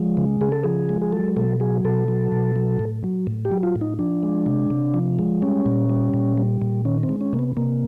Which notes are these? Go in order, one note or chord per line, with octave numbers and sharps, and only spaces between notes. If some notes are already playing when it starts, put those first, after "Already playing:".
Already playing: F3 G#3
C#3
C#3 G#4
A4
F3 G#4
G#3
G#4
F#3 A4
B2 A4
F#3 G#4
B2 A4
F#3
B2
F#3
A2
F#3
A2
G4
F#3
F4
A2
D#4
F3 D4
G#3
C3
C3
F3
G#3
G3 C#4
A#2
G3
A#2
G3
A#2
D#3 C#4
C4
G#3
C#4
C3 A#3
B3
C3 A#3